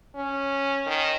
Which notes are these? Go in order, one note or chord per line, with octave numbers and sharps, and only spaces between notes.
C#4
D#3